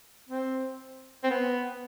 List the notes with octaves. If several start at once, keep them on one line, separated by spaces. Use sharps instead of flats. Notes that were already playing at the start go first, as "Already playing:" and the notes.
C4
C4
B3